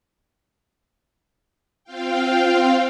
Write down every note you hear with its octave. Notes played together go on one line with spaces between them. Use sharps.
C4 F4 F5 G5